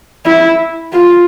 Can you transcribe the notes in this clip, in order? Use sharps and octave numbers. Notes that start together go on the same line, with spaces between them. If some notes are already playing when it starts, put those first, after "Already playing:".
E4
F4